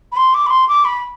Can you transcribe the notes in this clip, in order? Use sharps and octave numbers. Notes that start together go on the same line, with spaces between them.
B5
C6
D6
B5
C6
D6
B5